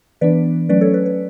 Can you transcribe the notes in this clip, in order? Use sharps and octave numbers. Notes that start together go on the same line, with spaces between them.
E3 B3 D4 B4 D5
F#3 A3 C#4 B4 D5
A4 C#5
B4
B4